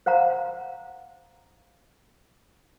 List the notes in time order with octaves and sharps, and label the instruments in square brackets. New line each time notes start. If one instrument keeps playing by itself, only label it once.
[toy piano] C5 F5 F#5 A#5